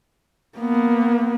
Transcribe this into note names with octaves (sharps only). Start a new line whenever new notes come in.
A#3 B3